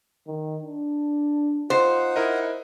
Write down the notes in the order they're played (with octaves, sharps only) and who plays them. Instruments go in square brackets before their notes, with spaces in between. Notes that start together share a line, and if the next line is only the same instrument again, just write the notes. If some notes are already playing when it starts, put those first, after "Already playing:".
[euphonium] D#3
D4
[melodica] D#4 F#5 [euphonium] F4 [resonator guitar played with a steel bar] C5
[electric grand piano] E4 A#4 D#5